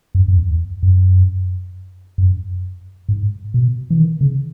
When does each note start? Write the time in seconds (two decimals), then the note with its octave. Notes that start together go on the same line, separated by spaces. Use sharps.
0.15 F#2
0.28 F#2
0.38 E2
0.83 F#2
2.18 F#2
3.09 G#2
3.54 B2
3.91 E3
3.99 D#3
4.21 C#3